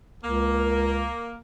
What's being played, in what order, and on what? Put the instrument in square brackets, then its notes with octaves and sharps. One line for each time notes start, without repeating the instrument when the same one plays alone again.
[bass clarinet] C#2 [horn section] A#3